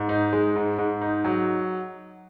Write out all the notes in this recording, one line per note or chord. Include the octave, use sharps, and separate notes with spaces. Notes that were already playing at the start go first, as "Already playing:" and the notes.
Already playing: G#2
D#4
G#3
G#2
G#2
D#4
F#3